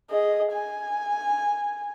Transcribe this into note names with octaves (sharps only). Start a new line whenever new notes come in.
G#4 D#5
G#5